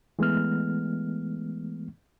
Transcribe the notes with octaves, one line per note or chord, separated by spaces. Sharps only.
E3 G#3 A3 B3 F6